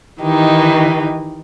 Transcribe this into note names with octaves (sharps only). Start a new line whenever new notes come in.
D#3 E3 D#4 G4